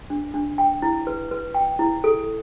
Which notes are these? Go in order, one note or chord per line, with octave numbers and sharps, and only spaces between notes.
D4
D4
G5
E4
B4
B4
G5
E4
A4